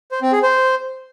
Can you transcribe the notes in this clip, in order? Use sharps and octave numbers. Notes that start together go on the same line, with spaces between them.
C5
C4
G#4
C5